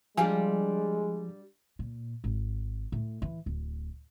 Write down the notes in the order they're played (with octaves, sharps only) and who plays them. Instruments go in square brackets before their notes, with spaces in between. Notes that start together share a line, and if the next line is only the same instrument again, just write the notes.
[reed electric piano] F3 [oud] G3 D4 F4 [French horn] G#3 [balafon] G#5
[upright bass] A#2
G#1
A2
E3
D1